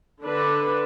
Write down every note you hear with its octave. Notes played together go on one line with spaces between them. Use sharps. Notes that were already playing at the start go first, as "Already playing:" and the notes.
D3 D4 B4